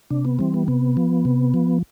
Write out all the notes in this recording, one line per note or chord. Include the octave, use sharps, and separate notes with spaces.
C3 D4
B3
E3 G3 C4
B3
C3 B3
F3
C3
F3